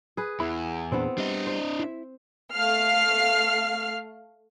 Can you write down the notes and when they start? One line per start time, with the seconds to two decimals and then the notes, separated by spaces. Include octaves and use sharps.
0.17 G#4 B4
0.40 E2 E4 B5
0.92 A#2 B3 C4 D4 G#4
1.18 G3 D4 D#5
1.47 C5
1.79 E4 E5
2.54 A3 F5 F6 C7